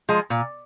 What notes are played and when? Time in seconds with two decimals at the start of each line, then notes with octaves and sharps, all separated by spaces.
0.09 F3 G#3
0.30 A#2